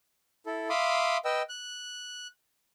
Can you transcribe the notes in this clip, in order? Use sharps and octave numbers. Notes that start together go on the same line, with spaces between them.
E4 A4
E5 F5 B5 C6 D6 D#6
B4 D#5 G5 E6
F#6